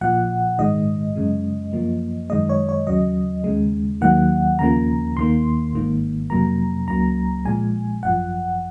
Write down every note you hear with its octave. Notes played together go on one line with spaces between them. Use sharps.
A#1 A#2 F3 F#5
A#1 G#2 D#3 G#3 D#5
F#2 C#3 G#3
F#2 F3 A#3
F#2 D#3 G#3 D#5
C#5
C#5
D#2 C#3 F#3 D#5
D#2 C#3 G#3
D#2 D#3 F#3 A#3 F#5
D#2 C#3 F3 A#3 A#5
D#2 D#3 A#3 C6
G#1 G#2 D#3 A#3
F2 C3 F#3 A#3 A#5
C#2 C#3 F#3 A#3 A#5
A#1 A#2 F3 G#3 G#5
G#1 F#2 F3 F#5